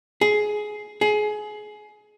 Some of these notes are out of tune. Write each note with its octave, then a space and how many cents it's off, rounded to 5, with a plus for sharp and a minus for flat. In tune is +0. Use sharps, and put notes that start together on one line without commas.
G#4 +15
G#4 +25